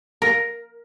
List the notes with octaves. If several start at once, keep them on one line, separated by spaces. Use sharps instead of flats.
A#4